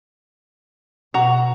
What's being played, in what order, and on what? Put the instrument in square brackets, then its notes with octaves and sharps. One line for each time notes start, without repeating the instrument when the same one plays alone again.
[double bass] B2 [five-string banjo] F#4 A#5